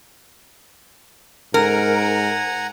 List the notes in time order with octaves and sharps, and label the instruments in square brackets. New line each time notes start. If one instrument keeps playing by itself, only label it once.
[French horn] G#2 [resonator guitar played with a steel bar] A#4 [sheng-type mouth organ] F#5 G#5 A#5